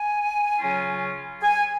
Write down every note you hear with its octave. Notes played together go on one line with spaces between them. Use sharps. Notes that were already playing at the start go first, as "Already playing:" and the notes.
Already playing: G#5
C#3 F#3 C#4 F4
G#5